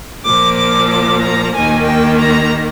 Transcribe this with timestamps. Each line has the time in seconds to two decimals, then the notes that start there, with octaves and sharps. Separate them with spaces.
0.25 A#2 F3 A#3 D6
0.57 D6
0.89 D6
1.21 A#5
1.54 D#2 D#3 A#3 G#5
1.85 G5
2.18 A#5